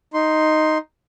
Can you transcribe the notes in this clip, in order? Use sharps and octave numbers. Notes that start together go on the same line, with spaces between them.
D#4 C6